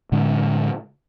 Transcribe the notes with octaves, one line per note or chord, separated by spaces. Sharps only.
A2 D3 G#3 C#4